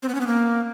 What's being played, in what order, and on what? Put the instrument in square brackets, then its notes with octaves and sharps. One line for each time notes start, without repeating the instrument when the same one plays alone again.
[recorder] C4
B3
C#4
B3
A#3